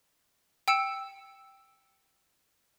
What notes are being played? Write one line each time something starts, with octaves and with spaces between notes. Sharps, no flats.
G5 E6 C#7 E7